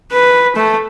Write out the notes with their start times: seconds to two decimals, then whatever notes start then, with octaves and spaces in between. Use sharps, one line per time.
0.12 B4
0.56 A3